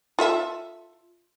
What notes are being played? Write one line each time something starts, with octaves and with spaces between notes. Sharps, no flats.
F4 A4 E5